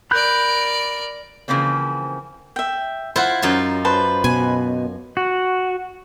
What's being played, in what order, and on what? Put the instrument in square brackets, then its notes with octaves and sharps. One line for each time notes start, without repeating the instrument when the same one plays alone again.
[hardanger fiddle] A#4 D5 [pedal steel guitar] B5 F#6 G6
[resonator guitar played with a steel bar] C#3 E3 F3 A#3 C4
[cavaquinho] E5 G5
[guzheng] E4 F4 [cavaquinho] C5 F#5
[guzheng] F#2 D#4 F4
[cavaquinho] B4 C5 A5
[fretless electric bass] B2 [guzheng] G#5
[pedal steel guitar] F#4